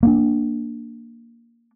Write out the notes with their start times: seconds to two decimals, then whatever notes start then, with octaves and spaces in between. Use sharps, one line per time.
0.03 A#3 B3 D4